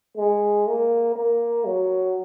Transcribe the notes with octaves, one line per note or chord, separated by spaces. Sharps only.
G#3
A#3
A#3
F#3